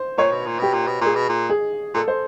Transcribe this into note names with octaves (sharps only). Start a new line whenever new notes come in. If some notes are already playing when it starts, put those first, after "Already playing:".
Already playing: C5
A#2 C#5
B2
A#2
B2 G4
A#2
B2
A#2 G#4
B2
A#2
G#4
A#2 A4
C5